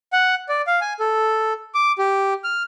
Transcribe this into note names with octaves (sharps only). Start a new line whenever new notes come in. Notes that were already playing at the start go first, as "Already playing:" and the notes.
F#5
D5
F5
G#5
A4
D6
G4
F6